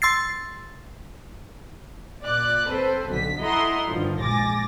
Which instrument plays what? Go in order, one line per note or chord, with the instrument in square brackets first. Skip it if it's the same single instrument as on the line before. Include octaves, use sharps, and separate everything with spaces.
[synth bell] C6 E6 A6 C7
[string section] A#2 D5 F#6
C4 A4 B4 C5
B1 D3 B6
E4 A4 D#5 F#5 A#5 C6
G2 D3 D#3 F3
A#1 G#2 G#5 D6 A6 A#6